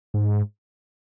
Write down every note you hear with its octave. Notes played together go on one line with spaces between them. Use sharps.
G#2